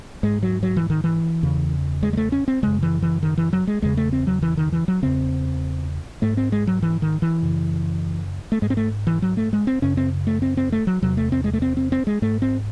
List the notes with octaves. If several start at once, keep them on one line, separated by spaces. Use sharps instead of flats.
G#2 G#3
F#3
F#3
E3
D#3
E3
E2 C#3
G#3
G#3
A3
C#4
C4
F#2 C#3 G#3
E3
E3
D#3
E3
F#3
G#3
E2 C#3 G#3
A3
C4
F#3
E3
D#3
E3
F#3
E2 C#3 C4
G#2 A3
C4
G#3
F#3
E3
D#3
E3
F#2 C#3
A3
G#2 G#3
C4
A3
E3
F#3
A3
G#3
C4
F#2 C#3 C#4
C4
A3
C4
C4
A3
F#3
E2 C3 F#3
A3
C4
G#3
A3
C4
C4
C4
G#3
G#2 A3
C4